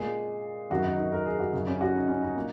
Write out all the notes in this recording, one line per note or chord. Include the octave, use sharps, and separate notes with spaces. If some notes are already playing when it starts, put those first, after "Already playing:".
Already playing: A#2 G#3 G#4
F#2 D#3 F#3 F#4
D#4
D#4
A#4
G#4
F#4
F#2 C#3 F#3 D#4
C#4
F#4
D#4
C#4
D#4
A#2